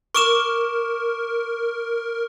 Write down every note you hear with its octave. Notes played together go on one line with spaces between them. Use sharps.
A#4 C#6 D6 E7